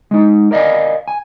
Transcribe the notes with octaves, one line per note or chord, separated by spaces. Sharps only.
G#3 D#4
A#4 D5 D#5 F5 G#5
G#5